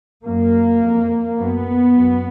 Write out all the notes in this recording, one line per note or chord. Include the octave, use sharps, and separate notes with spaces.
F#2 A#3
F2
F#2 B3
F#2